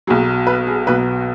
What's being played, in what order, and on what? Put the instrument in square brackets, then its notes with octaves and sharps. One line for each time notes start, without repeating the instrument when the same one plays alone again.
[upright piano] B1 B2 F#3 G#4
B4
G#4
B1 B2 F#3 B4